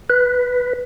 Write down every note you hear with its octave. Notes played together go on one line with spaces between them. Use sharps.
B4